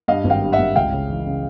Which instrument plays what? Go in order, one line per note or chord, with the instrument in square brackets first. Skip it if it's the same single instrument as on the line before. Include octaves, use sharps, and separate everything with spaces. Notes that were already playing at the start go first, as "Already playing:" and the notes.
[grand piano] G2 D#5 F5
G#1
F5 G5
G2
E5 F#5
G#1
C#2 F5 G5
C#3
E3
C#3